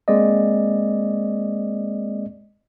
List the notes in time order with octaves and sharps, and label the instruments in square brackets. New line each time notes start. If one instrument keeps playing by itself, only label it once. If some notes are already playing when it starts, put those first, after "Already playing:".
[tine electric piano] G#3 A#3 C4 D5 D#5